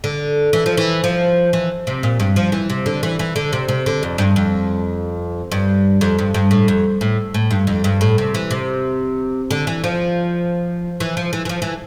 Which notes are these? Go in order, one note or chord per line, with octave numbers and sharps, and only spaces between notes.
D3
E3
F3
E3
F3
E3
C3
A#2
G2
F3
E3
C3
D3
E3
E3
D3
C3
C3
D3
F2
G2
F2
G2
F2
G2
G2
A2
F2
A2
A2
G2
F2
G2
A2
C3
E3
C3
D3
E3
F3
E3
F3
E3
E3
F3
E3